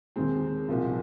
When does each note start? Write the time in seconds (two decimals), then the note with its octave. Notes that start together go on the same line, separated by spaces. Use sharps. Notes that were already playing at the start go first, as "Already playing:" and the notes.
0.16 D#2 D#3 G#3 C4
0.68 C2 A#2 F3 C4